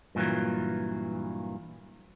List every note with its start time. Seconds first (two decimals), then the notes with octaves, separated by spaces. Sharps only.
0.15 G2 A#2 C#3 E3 F#3